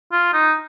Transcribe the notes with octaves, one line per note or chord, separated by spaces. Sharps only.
F4
D#4